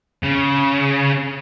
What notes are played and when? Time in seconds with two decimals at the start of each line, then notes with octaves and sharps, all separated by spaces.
0.23 C#3